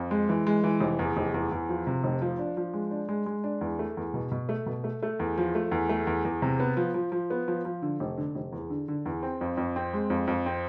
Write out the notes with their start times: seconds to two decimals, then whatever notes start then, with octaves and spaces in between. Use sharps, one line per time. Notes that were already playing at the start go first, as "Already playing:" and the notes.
Already playing: F2
0.11 G#3
0.29 E3
0.47 G#3
0.64 E3
0.80 F1
0.99 E2
1.17 F1
1.34 E2
1.51 E2
1.69 F3
1.87 C3
2.04 F1
2.22 F3
2.39 D4
2.57 F3
2.74 G#3
2.91 D4
3.09 G#3
3.26 G#3
3.44 D4
3.61 E2
3.79 A3
3.97 E2
4.14 B2
4.32 B2
4.49 A3
4.66 B2
4.84 A3
5.03 A3
5.19 E2
5.38 F3
5.55 A3
5.71 E2
5.89 A3
6.07 E2
6.25 E2
6.42 C3
6.60 B3
6.77 F3
6.94 F3
7.12 F3
7.30 B3
7.48 F3
7.65 F3
7.82 D3
8.00 F1
8.18 D3
8.35 F1
8.52 E2
8.70 D3
8.88 D3
9.06 E2
9.23 C4
9.41 F2
9.57 F2
9.76 C4
9.93 G#3
10.10 F2
10.27 F2
10.46 C4